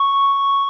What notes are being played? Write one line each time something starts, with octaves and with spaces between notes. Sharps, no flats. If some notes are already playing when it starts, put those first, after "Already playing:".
Already playing: C#6